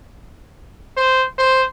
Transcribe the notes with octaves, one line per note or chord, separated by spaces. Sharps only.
C5
C5